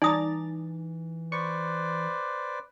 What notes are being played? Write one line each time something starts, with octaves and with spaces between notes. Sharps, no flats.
E3 D#4 D5 G#5 A#5 D#6 A6
B4 C5 D5 C#6